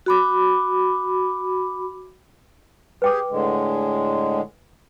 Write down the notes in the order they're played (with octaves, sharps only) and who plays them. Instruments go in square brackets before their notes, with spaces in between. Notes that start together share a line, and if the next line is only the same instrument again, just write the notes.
[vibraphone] F#4 B5 D6
[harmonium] G4 G#4 [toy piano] B4 G5 D6
[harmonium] A2 D3 G#3